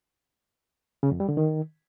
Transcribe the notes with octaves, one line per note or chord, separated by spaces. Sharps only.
C#3
F2
G3
D3
D#3